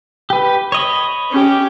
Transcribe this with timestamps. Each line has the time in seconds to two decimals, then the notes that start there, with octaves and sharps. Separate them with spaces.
0.30 G4 B4
0.72 C#5 D#5 B5
1.31 C#4 G4